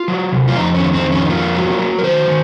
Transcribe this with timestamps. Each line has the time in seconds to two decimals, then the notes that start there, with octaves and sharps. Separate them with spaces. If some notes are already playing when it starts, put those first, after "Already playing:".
Already playing: F4
0.08 F#3
0.32 C3
0.48 F4
0.56 F2 D#4
0.75 C#4
0.82 D#3
0.93 C4
1.05 F2
1.12 C#4
1.25 D#4
1.30 A#3 F4
1.54 F#3
1.79 F#3
1.99 A#4
2.03 D#3 C5
2.28 D#3